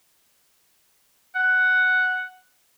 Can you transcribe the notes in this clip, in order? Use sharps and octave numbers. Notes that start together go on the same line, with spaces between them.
F#5